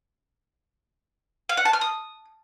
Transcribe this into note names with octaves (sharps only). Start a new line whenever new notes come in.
F5
F#5
A5
F6
D#6